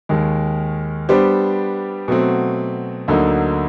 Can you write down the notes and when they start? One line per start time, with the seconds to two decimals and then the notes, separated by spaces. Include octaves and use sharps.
0.09 D#2 D#3 G#3
1.09 G3 B3 D4 G4 C5
2.08 B2 F#3 A3 C4
3.08 D2 D3 F#3 A#3 D#4